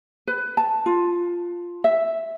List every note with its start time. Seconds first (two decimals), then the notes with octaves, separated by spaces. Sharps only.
0.27 B4
0.57 A5
0.86 F4
1.84 E5